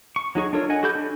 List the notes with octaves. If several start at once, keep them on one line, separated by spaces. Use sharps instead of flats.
C#6
F#3 D#4 G#4 C#6
D4 F4 A4 A#4 C#5
D#5 F#5 G#5
F#4 G4 A4 B5 G6
D4